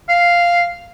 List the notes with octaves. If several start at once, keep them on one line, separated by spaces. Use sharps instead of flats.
F5